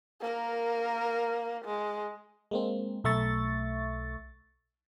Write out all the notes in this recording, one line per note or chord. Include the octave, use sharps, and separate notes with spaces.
A#3 A#4
G#3
G#3 A#3 C4
B1 A3 E5 C#6 A6